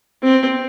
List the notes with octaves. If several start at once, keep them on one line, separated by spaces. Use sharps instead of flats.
C4